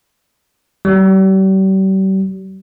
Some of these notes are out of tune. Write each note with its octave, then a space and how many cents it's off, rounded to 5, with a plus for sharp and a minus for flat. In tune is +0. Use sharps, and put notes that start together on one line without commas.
G3 -40